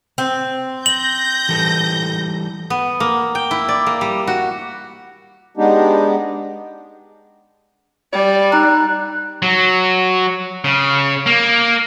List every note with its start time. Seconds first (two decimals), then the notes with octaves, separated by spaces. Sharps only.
0.18 C4
0.86 G6 A#6 F#7
1.49 E3 G3 A4
2.70 B3
3.00 A#3
3.35 G5
3.51 E4
3.68 D5
3.86 A#3
4.01 G3
4.27 F#4
5.57 G#3 B3 D4 D#4 G4
8.13 G3 D5
8.52 D#4 A#5 F#6
9.42 F#3
10.64 C#3
11.26 A#3